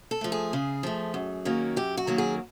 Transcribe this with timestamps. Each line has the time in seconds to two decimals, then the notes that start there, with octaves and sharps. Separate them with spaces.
0.11 A4
0.21 F3 A3
0.32 G#4
0.53 C#3
0.83 F3 A3
1.14 F#2
1.45 D#3 F#3 A#3 C#4
1.76 F#2 G4
1.97 F#4
2.07 D#3 F#3 A#3 C#4
2.18 G#4